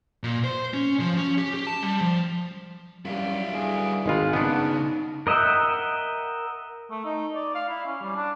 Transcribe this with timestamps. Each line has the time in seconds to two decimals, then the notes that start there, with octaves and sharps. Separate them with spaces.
0.23 A#2
0.44 C5
0.74 C#4
1.00 F3
1.17 C#4
1.38 G4
1.54 G4
1.67 A5
1.83 G3
2.01 F3
3.05 F#2 G3 E4 F5
3.53 G2 D3 G#4
4.06 G#1 G#3 D#4 F4 B5
4.33 C#3 B3 D4
5.27 A#4 D#5 E5 F#5 G5
6.91 A3
7.05 D#4
7.35 D5
7.55 F5
7.68 E4
7.86 C#4
8.01 G3
8.16 D4